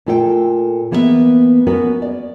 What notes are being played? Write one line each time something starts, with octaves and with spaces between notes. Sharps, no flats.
A#2 A3 F4 A4 B4 G5
E3 A#3 B3 B4 C5 E5
B3 C#4 F#4 A#4 B4
D5